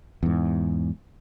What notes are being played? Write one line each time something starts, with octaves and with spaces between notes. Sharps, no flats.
E2 G#2